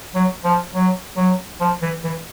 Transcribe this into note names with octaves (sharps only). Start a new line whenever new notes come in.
F#3
F3
F#3
F#3
F3
E3
E3